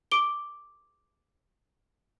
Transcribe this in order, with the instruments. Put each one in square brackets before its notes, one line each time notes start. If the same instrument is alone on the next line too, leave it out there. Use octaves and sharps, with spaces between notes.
[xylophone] D6 D7 G7